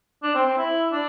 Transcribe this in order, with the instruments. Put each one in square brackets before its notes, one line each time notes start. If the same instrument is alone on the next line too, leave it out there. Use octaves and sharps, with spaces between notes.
[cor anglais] D4
C4
C4
E4
D4